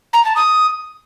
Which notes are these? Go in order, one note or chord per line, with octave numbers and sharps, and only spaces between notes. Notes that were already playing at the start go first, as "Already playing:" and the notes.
A#5
A5
D#6